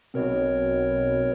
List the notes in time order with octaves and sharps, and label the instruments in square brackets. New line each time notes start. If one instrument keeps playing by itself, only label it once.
[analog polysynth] B1 B2 [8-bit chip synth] C4 A#4 C#5